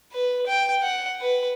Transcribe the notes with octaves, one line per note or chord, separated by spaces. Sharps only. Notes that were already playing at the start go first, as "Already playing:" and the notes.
B4
G5
F#5
B4